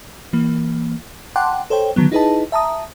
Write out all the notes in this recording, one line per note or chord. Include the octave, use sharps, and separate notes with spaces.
E3 A#3
F#5 G5 A5 C6 D6 F#6
A4 C5 C#5 G5
D3 D#3 F#3 B3
D#4 E4 G#4 B4 D#5 A5
E5 A5 A#5 D#6